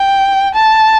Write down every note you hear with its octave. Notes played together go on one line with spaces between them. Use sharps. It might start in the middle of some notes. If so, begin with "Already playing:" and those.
Already playing: G5
A5